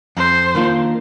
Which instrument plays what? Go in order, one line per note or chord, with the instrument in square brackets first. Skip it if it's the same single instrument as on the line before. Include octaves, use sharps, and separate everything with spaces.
[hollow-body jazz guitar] F2 [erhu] C5
[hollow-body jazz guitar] D#3 A#3 D4 F4